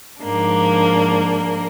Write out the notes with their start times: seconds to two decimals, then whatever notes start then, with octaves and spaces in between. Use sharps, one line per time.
0.22 G#2 F3 A#3 D4